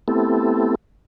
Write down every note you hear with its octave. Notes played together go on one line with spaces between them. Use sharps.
A3 B3 C4 E4 G4 A4